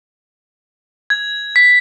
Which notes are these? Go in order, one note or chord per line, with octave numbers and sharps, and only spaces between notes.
G#6
B6